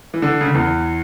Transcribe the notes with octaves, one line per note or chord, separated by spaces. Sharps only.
E3
D3
C#3
D3
E2 E3